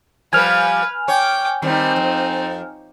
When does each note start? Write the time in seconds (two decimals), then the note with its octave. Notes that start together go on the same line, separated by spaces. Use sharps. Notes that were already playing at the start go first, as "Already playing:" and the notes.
0.33 F3 G3 B4 G#5 F6
1.08 C#5 G5 D6
1.62 D#3 G3 C4 D#4
1.96 F2